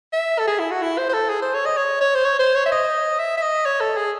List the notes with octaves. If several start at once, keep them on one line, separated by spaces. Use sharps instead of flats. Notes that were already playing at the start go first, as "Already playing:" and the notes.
E5
A4
G#4
E4
F#4
E4
C5
C5
A4
G#4
C5
C#5
D#5
C#5
C#5
C5
C#5
C5
C#5
E5
D#5
E5
E5
D#5
C#5
A4
G#4